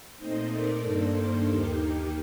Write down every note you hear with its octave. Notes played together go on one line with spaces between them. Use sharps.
A#2 A3 C4 D#4 C5 D#5
A#4 D5
G2 D#3 A#3 D4 A4 C5
D#2 D#3 A#3 D#4 G4 A#4
G4